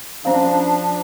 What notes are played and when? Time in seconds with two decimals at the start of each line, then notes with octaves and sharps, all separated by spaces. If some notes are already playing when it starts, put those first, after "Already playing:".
0.25 F3 C#4 D4 C5 F5